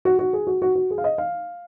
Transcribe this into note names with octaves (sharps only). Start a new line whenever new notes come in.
F#4
F#4
G#4
F#4
F#4
F#4
G#4
F5
D#5
F5